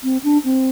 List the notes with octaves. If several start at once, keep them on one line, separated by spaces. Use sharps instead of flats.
C4
D4
C4